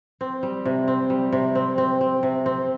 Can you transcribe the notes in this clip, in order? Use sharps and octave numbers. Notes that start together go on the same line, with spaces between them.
C4
G3
C3
C4
G3
C3
C4
C4
C4
C3
C4